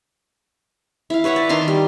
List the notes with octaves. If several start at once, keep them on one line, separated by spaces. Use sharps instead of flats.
E4 F5
B4 C#5 E5 F#5
D5
D#3 A5 A#5 C6
G3